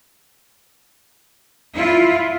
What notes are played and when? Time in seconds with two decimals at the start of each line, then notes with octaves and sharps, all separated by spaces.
1.77 E4 F4